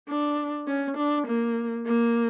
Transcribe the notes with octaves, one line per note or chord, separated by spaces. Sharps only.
D4
C#4
D4
A#3
A#3